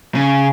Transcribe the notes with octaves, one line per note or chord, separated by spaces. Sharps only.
C#3